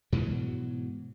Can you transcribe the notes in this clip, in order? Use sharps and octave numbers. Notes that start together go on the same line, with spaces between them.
G#2 B2 E3 F#3